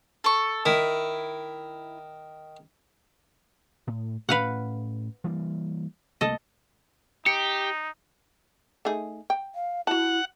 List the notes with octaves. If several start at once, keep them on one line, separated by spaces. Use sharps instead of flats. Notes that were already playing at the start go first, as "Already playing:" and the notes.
A4 C#6
D#3 E4
A2
A2 C#4 B4 F5 F#5
E3 G3 A#3
C2 A3 A#3 A4 D#5
D#4 G4 C#7
A3 D#4 G#4
G5
F5
E4 F#4 F#5 A5